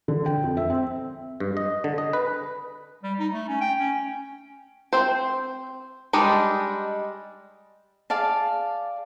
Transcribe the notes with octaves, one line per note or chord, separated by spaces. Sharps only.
D3
G5
F2
E5
C4
G2
D#5
D3
D#5
B4
G3
D#4
A3
C#4
G5
C#4
C4 C5
G3 G#3 D4 D#4
G#4 D5 F5 A5